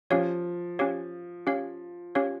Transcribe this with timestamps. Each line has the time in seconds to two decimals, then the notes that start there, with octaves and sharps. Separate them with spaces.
0.10 F3 C#4 G4 C#5 F5
0.79 C#4 G4 C#5 F5
1.47 C#4 G4 C#5 F5
2.15 C#4 G4 C#5 F5